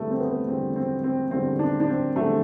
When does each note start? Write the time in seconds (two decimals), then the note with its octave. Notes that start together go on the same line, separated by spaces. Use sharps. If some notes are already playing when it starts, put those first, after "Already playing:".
Already playing: E2 D3 G3 A3 B3
0.11 C4
0.20 B3
0.47 E2 D3 G3 C4
0.76 C4
1.04 C4
1.31 E2 D3 G3 C4
1.59 D4
1.80 D4
1.88 C4
2.15 E2 D3 G3 A3